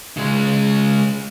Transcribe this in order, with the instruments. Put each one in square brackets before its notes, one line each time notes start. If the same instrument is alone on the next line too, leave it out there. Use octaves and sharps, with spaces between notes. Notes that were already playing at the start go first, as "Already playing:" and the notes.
[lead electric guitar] C#3 G#3